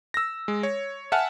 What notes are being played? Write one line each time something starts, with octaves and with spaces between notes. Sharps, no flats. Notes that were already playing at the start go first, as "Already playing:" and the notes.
E6 A#6
G#3
C#5
E5 F#5 G#5 A5 F6